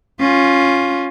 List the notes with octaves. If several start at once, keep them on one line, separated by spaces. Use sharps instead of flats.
C#4 F4